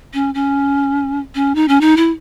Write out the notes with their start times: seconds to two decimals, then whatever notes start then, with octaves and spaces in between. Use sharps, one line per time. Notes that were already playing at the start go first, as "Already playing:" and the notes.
0.14 C#4
0.34 C#4
1.35 C#4
1.55 D#4
1.68 C#4
1.81 D#4
1.97 E4